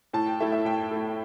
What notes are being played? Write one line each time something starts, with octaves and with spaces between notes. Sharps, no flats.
A2 A5
G5
A3 E4 E5
E5
A2 G5
A3 E4